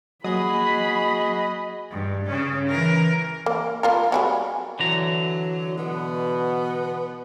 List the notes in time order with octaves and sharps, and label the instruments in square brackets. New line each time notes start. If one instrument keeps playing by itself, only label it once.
[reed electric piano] F#3 A#3 [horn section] F#4 G#4 [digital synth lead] D#5 [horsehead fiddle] B5
[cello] G2
C#3 C#4
E3 A#4
[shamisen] A#3
A#3 F4 A#4
F#3 G3 G#4
[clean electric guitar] D3 E3 A#5 [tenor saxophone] F#3
[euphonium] B2 [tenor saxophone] B3